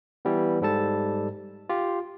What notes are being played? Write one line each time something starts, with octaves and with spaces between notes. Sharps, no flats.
E3 G3 B3
G#2 G3 A4 A5
F4 G4